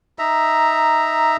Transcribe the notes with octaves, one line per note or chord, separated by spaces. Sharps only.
D#4 E5 A#5